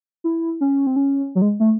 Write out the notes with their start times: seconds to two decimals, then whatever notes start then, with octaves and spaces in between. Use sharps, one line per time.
0.24 E4
0.61 C#4
0.87 C4
0.96 C#4
1.35 F#3
1.42 G#3
1.60 A3